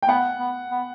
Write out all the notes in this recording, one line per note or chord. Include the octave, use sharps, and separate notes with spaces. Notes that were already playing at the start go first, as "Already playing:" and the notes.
G5
B3 F#5
B3
B3